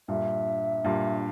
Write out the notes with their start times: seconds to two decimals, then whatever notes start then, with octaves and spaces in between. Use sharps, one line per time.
0.08 G2 A#2 E5
0.84 G2 A#2